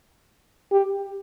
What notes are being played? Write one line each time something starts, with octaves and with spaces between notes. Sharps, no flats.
G4